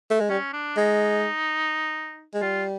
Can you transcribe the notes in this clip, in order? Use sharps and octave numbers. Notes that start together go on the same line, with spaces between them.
A3
G#3
G3 C#4
D4
G#3 D#4
G#3
G3 F4